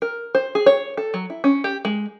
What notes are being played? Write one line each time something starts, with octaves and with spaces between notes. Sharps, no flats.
A#4
C5
G#4
C#5
A4
F#3
E4
C#4
G4
G#3